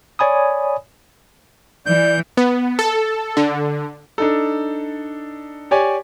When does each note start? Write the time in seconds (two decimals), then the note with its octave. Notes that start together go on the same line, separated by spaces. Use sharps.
0.19 C#5 D5 G#5 B5 D#6
1.86 E3 D5 G6
2.37 B3
2.79 A4
3.37 D3
4.18 D4 D#4 A4
5.71 G4 C#5 D5 G#5